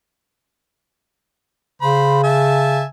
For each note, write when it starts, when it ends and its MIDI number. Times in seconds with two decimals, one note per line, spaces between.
1.82 2.85 49
1.82 2.21 72
1.82 2.21 83
2.24 2.84 76
2.24 2.84 80
2.24 2.84 81